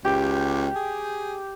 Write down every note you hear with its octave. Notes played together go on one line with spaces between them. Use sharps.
C#2 G4
G#4